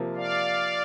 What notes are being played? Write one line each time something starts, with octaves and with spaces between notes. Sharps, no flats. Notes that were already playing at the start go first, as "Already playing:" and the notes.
Already playing: C3 F3 A#3
D5 F5